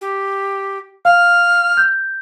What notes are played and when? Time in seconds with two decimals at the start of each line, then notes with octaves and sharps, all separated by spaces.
0.01 G4
1.05 F5 F6
1.77 G6